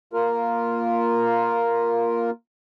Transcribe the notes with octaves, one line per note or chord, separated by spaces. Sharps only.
A#3 F4 A#4